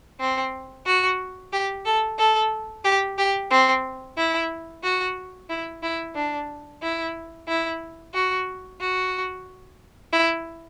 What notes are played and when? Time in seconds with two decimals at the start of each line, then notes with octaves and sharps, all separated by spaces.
0.20 C4
0.86 F#4
1.53 G4
1.85 A4
2.18 A4
2.84 G4
3.18 G4
3.50 C4
4.17 E4
4.83 F#4
5.50 E4
5.83 E4
6.15 D4
6.82 E4
7.48 E4
8.14 F#4
8.81 F#4
10.13 E4